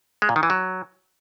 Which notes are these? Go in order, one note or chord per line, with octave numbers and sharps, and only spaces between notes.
G#3
A#2
D#3
E3
F#3